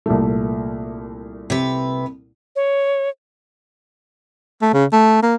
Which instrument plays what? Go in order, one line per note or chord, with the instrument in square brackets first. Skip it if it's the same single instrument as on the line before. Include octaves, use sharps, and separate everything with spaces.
[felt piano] C2 A#2 A3
[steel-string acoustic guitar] C3 B4
[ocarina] C#5
[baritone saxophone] A3
C#3
A3
A#3